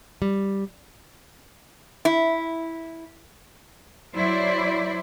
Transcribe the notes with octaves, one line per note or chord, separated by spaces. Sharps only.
G3
E4
F#3 E4 C5 D5